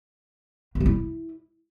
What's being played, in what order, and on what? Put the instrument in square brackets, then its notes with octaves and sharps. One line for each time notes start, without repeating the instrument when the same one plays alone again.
[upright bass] A#3
G3
E4